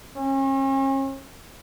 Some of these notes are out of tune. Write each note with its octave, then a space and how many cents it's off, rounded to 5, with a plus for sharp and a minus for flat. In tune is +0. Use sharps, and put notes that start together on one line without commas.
C#4 -40